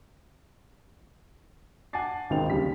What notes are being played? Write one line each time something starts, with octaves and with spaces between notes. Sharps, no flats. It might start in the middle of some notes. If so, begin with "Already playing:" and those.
F#5 G#5 A5 D6 A6 C7
G#1 C#2 D#3 C4 G5 F7
D#2 C#3 G3 B6